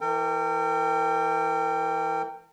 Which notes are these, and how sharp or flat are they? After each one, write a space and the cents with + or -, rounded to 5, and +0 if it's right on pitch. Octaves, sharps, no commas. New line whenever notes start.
E3 +0 A#4 -40 G5 +10